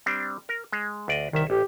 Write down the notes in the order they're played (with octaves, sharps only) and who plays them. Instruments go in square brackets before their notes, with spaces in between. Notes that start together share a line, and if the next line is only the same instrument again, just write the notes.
[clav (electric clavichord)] G3 C4 D4
A#4
G#3
D2 D5 D#5
[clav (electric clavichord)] C2 E5 [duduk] D#3
[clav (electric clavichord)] A1 [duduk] G4